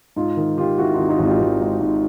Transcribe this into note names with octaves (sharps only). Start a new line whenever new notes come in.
G#2 D#4 F4
D#3
D#3 F4 G4
D#3 E4 F#4
G#1 D#4 F4
D#4 F4
G#1
F4 G4
G#1
G#2
G#2